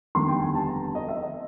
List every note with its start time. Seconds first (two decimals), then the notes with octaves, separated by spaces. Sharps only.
0.15 F1 D#2 D3 G3 B3 C6
0.28 G5
0.41 G#5
0.55 A5
0.69 A#5
0.95 D#5
1.08 E5
1.22 D#5